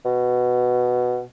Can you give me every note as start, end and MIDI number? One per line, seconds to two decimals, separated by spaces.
0.05 1.22 47